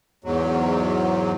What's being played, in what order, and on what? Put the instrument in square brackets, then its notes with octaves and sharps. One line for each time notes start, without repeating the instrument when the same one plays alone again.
[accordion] E2 G#2 F#3